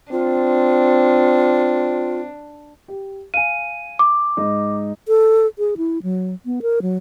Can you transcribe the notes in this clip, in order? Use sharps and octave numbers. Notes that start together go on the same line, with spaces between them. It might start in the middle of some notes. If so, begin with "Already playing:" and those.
C4 D4 F4
G4
F5 G#5 D#7
D6
G#2 D#4
A4
G#4
E4
F#3
B3
A#4
F#3